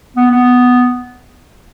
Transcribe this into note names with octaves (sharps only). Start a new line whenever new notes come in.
B3
B3